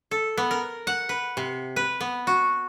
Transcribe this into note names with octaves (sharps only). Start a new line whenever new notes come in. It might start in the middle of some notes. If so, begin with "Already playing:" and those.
A4
B3
A#4
F#5
B4
C3
B4
B3
F#4